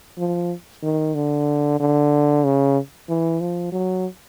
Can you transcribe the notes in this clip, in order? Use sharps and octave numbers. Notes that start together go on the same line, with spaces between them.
F3
D#3
D3
D3
C#3
E3
F3
F#3